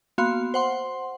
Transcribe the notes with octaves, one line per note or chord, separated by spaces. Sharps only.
A#3 B3 F#4 F5 C6
C5 F#5 C6